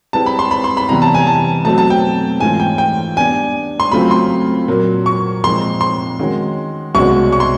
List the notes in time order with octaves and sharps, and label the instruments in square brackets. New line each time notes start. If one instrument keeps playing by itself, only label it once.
[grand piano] G3 C4 E4 G#4 B4 [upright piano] A5
[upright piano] B5
C6
B5
C6
B5
[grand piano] C3 E3 G3 B3 [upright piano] A#5
[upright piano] A5
G#5
A5
[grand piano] B2 F#3 A3 C4 [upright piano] A5
[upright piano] A5
G5
[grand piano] G#2 E3 A3 C#4 F4 [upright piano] G#5
[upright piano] G5
G5
[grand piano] G3 B3 D4 [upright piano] G#5
[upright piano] C6
[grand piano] C#3 F#3 A3 C4 F4 [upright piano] B5
[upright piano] C6
[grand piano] A#2 F#3 A#3
[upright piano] C#6
[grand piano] A#2 F3 G#3 C4 D#4 [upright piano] C6
[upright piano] C6
[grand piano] D#3 G#3 C#4 F#4
[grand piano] C2 B2 G#3 C#4 F#4 [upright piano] C#6
[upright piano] C#6
C6